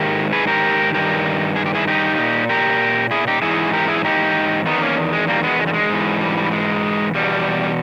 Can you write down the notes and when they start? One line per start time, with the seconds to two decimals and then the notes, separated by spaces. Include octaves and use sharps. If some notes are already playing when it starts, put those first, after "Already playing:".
Already playing: G#2 D#3 G4 A#4
0.32 G#4 B4
0.47 G4 A#4
0.94 G2 D#3 G4 A#4
1.56 G#4
1.66 G4
1.75 E4 G#4
1.88 D#4 G4
2.18 A#2
2.49 G4 A#4
3.11 E4 G#4
3.27 D#4 G4
3.42 G#2 E3 E4 G#4
3.73 G4 A#4
3.88 E4 G#4
4.05 D#4 G4
4.66 E2 D#3 B3 D#4
4.81 A#3 C#4
5.13 G#3
5.28 G3 A#3
5.43 G#3 B3
5.59 G#3
5.67 G3
5.74 G#3
5.90 G#2 E3
6.21 G3
6.37 G3
6.52 G#3
7.14 E2 B2 G3